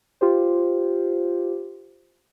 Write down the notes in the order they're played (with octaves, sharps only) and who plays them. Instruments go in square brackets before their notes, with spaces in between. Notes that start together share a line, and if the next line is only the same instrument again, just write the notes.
[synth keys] F4 G4 C5